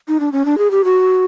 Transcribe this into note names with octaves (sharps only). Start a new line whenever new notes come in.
D#4
D4
C#4
D4
G#4
G4
F#4